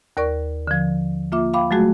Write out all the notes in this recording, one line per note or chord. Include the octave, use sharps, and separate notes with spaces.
D#2 A#4 D5 C#6
D3 F3
A#3 F4 E5 D6
F5 G5 B5 D6
F#3 G#3 A3 F#4 G#4